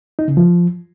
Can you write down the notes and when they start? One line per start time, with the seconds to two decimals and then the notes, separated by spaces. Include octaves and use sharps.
0.19 D#4
0.28 C#3
0.37 F3